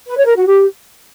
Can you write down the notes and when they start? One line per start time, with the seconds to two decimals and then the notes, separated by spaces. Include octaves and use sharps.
0.07 B4
0.17 C#5
0.26 A#4
0.36 F#4
0.46 G4